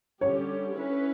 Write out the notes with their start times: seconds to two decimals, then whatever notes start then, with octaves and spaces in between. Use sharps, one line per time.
0.21 D3 G3 C#4 G4 C#5
0.76 C#4 E4 B4